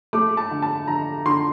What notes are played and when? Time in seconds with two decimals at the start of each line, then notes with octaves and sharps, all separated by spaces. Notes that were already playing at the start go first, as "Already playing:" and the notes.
0.13 A3 D6
0.37 A5
0.51 D3
0.62 A5
0.88 D3 A#5
1.25 D3 C6